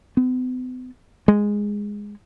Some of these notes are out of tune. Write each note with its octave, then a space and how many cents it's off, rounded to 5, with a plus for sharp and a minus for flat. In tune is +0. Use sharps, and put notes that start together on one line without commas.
B3 +45
G#3 -10